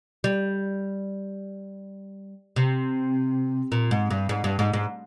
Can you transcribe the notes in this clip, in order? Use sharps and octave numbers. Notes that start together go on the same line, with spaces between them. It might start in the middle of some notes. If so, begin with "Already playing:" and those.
G3
C3
A#2
G#2
G2
G#2
G2
G#2
G#2